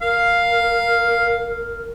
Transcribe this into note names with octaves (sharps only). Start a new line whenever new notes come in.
A#4 F5